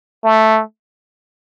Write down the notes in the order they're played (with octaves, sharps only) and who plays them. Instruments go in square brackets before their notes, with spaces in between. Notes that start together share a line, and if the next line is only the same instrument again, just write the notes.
[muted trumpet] A3